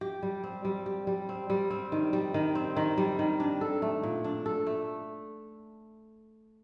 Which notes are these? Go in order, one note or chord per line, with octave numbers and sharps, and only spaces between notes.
G4
G3
C4
G3
G4
G3
C4
G3
C4
D#3
G3
D#3
C4
D#3
G3
D#3
D4
A4
A3
A#2
D4
A4
A3